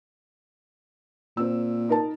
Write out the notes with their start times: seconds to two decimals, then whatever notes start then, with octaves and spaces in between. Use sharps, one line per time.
1.37 A#2 C4 E6
1.89 D#4 A#4 A5